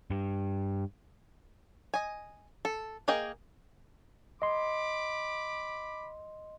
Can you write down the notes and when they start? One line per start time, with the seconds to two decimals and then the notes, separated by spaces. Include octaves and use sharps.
0.10 G2
1.94 D#5 G#5
2.65 A4
3.08 A#3 G#4 D#5 G5
4.42 D#5 B5 C6 D6